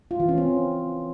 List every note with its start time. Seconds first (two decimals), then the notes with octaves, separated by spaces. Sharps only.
0.11 F4
0.20 E3
0.29 C#4
0.38 C4